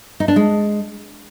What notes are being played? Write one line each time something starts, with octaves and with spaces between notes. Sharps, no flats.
D#4
D4
G#3